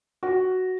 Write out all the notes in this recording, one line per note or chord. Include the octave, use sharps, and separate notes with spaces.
F#4